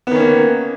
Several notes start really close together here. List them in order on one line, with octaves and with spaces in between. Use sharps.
B3 D#3 C#4 A#3